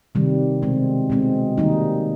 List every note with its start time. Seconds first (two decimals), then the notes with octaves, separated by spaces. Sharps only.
0.15 C3 D#3 G3
0.62 B2 G#3 C4
1.10 B2 G#3 C4
1.58 D#3 G3 A#3 D#4